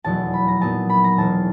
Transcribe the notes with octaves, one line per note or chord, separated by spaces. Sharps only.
F1 E2 B2 F#3 A5
B5
A#5
A#2 F#3 B3 D#4 A5
B5
A#5
E1 E2 B2 A5